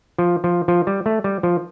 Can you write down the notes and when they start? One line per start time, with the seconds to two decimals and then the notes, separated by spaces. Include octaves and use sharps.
0.19 F3
0.44 F3
0.68 F3
0.87 G3
1.06 A3
1.24 G3
1.43 F3